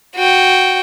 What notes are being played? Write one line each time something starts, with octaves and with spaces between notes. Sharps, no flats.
F#4 G5